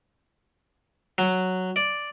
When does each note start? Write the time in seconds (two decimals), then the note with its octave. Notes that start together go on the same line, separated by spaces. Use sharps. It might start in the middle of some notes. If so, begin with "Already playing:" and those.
1.18 F#3
1.76 D5